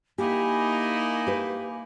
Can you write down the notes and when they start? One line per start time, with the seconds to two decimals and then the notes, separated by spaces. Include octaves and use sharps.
0.18 A#3 D#4 E4 G4 A#4 G#5 B5 D6
1.27 G4 B4